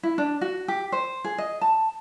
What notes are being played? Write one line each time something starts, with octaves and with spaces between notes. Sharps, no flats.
E4
D4
F#4
G4
C5
G#4
D#5
A5